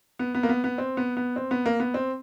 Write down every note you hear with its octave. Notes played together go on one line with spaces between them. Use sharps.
B3
B3
A#3
B3
B3
C4
B3
B3
C4
B3
A#3
B3
C4